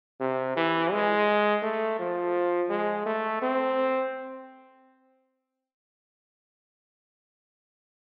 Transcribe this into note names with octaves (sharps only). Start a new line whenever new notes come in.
C3
E3
G#3
A3
F3
G#3
A3
C4